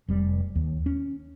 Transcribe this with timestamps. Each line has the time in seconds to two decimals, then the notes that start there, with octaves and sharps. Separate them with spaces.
0.08 F1 G3
0.55 D#2
0.86 C#4